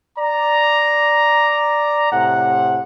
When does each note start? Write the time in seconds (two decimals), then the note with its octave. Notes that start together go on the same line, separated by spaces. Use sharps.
0.18 D5 A#5
2.12 A2 C3 F#5